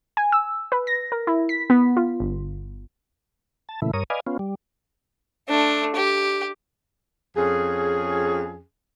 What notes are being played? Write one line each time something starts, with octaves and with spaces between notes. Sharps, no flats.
G#5
E6
B4
A#6
A#4
E4
B6
B3
F4
G1
A5
A#2 C#3 E3 A3 E4
G2 A#4 C#5 D#6
B4 D5 D#5 F5 G#5
B3 C#4 F4
G3
A3 D4
G4
F2 C#4 G#4